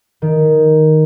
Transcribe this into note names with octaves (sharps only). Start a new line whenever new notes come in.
D#3